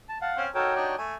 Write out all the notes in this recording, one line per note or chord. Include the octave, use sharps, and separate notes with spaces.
A5
F5 F#5 A5
C4 C#4
D#4 F#4 A4 A#4 C#5 G5
D4 D#4 G4
A3 G#5